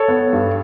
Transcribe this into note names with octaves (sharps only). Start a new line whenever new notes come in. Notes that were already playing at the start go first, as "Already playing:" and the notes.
Already playing: A4 C#5
B3
G2